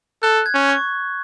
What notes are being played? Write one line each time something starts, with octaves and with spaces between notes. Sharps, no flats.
A4 F#6
G#6
C#4
C#6